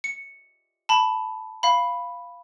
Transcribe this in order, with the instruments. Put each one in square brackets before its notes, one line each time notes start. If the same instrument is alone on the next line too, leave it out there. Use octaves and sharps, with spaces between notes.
[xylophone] C#7
A5 B5
F5 B5